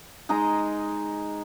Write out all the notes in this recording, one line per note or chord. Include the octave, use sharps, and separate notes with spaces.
G#3 D#4 D#5 A#5